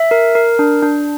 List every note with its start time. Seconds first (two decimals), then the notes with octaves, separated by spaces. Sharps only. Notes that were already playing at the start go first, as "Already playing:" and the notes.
Already playing: E5
0.11 A#4
0.35 A#4
0.59 D4
0.83 D4